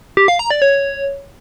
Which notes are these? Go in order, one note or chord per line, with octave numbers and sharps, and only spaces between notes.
G4
F5
A#5
D5
C#5